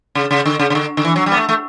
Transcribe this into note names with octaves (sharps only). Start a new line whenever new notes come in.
C#3
C#3
D3
C#3
C#3
D3
D3
E3
F#3
G3
B3
A3
A3